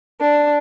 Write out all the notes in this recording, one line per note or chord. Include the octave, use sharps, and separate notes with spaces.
D4